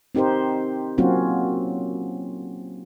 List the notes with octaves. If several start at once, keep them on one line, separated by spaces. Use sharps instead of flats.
C4 D#4 G4 A#4 C5
F#3 A#3 C4 C#4 F4 F#4